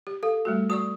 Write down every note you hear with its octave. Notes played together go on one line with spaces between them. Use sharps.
G4
A4 F5
G3 A3 F#4
F#4 D5 C#6 D#6